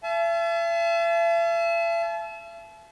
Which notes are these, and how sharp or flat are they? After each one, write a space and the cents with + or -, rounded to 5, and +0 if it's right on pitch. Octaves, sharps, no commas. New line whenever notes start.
E5 +40 A5 -35